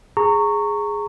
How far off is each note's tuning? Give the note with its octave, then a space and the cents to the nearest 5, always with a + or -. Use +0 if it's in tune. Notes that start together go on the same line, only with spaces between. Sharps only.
G#4 -5 A#5 -25 C#6 +0